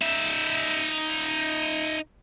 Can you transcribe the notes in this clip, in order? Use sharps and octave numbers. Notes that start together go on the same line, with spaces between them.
D#4 E5